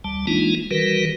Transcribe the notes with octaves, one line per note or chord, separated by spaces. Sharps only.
D2 G3 A5
E3 G#3 A#3 D4 D#4 F4
D#3 E3 G3 F#4 A#4 B4